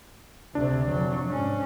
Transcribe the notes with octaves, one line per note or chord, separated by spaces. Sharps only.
D2 C3 D4
F1 F#3
G#2 C#4